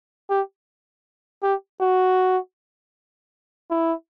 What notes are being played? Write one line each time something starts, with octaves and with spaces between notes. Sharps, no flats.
G4
G4
F#4
E4